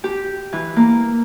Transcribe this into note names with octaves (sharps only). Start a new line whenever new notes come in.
G4
E3
A#3